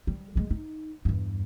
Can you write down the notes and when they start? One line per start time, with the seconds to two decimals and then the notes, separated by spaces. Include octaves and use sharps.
0.07 G3
0.35 G#3 A3
0.51 D#4
1.05 E2 G2